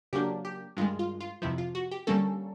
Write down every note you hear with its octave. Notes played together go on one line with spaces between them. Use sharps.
C#3 F#3 A#3 D4 G4
G4
G2 D#3 G#3 F4
F4
F4
F2 C3 F3 E4
F4
F#4
G4
D3 G3 A#3 C#4 A4